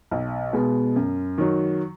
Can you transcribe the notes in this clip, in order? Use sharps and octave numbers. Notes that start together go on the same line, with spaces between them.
B1
B2 G#3 B3
F#2
D#3 F#3